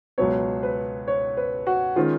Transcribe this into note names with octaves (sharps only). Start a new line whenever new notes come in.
C#2 B2 F#3 B3 C#5
B4
C#5
B4
F#4
D#3 G#3 C#4 F4